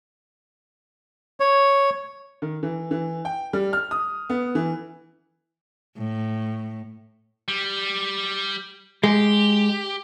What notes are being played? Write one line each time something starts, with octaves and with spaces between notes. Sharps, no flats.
C#5
D#3
E3
E3
G5
G3
F6
D#6
B3
E3
A2
G3
G#3 G4